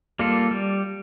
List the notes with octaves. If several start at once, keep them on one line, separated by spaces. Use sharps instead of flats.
G3 A#3 F4 A4
G3